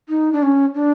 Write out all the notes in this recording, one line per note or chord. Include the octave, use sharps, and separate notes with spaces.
D#4
D4
C#4
D4